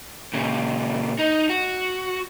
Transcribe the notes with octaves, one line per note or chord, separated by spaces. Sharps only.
A#2 C#3
D#4
F#4